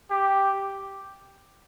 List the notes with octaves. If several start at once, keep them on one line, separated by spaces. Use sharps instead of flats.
G4